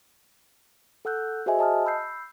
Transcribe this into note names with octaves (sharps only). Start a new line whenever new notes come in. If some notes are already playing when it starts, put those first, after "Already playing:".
A4 F#5 E6 F#6 G6
F#4 G#4 C5 D#5 E5 G#5
D#5 A5 D#6 F6
B5 E6 G6 C7